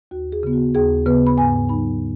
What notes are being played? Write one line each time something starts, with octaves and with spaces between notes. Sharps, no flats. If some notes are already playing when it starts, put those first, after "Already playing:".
D#2 F#4
G#4
C#3 B3
F#4
D#2 G#4
C#3 B3 B4
B5
G#2 G#5
F#3 D#4 B5